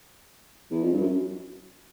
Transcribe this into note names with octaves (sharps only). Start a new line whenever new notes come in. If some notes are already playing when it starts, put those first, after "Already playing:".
E2
F2
G2
F#2